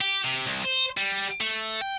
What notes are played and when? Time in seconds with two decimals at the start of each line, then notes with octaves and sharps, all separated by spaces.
0.01 G4
0.25 C3
0.46 C2
0.64 C5
0.97 G3
1.41 A3
1.81 G5